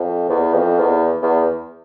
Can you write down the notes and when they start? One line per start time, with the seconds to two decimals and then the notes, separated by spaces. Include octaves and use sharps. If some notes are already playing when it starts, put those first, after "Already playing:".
Already playing: F2
0.29 E2
0.54 F2
0.79 E2
1.22 E2